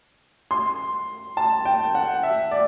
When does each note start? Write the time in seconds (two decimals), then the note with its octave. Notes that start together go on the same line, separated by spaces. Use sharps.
0.51 C6
1.37 A5
1.65 G5
1.95 F#5
2.23 E5
2.51 D5